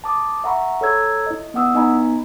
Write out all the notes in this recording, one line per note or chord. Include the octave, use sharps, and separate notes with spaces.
A5 D6 D#6
E5 F#5 A#5 B5 C#6
A4 C#5 A#5 E6 G#6
E4 D#5
B3 E4 F#5 D#6 E6
B3 D#4 D#5 G#5 A#5 B5